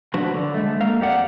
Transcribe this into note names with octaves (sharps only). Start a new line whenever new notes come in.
F3 F#3 D4 F#4 B4
D3
G#3 A3
A#3 A4 F5
F2 G4 D5 F#5